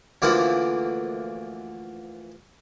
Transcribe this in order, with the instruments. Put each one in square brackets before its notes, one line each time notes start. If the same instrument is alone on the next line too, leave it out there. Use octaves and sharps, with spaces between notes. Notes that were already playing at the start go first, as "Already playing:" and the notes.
[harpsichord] D2 D3 E3 F3 A#3 D4